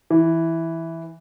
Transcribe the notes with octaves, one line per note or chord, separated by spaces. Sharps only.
E3